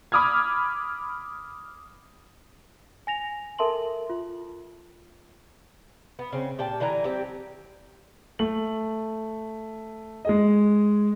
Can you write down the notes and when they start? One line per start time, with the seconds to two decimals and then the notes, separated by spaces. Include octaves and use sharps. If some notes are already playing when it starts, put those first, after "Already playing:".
0.12 B5 D6 D#6 F6 G#6
3.07 G#5 A#6 F7
3.58 A4 A#4 E5 A5 C6 F#7
4.10 F4
6.19 B3
6.32 C#3 C4
6.58 A#2 G4 G5 A5
6.80 D3 E3 G#5 A#5
7.04 G3 C4 G4
8.39 A3 F#7
10.25 G#3 G#4 D#5